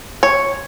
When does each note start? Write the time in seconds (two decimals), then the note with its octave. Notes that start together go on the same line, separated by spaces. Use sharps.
0.23 C#5